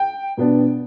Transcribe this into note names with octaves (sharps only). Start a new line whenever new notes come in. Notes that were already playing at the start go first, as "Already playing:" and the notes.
Already playing: G5
B2 B3 D4